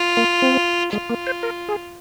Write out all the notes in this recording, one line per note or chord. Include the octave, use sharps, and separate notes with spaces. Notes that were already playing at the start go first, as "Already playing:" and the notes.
Already playing: F4
A#3
C4
G#3 F4
A#3
C5
A#4
G#4